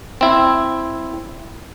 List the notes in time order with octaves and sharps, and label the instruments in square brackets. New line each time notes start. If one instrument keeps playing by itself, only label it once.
[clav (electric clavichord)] C4 E4